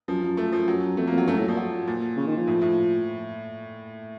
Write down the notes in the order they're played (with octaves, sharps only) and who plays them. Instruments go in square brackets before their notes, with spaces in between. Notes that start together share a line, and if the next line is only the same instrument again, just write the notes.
[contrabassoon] F#2 [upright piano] F3
[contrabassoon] F#2
[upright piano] A3
F3
F#3
[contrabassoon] F2 [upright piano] A3
[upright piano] A#3
[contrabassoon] F2
[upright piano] F#3
[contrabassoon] F#2 [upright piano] A3
[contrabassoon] A2 [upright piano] F#3
[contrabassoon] A#2 [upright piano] F3
[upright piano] F#3
A#2
[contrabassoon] C#3
D#3
F3
[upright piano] A2
A2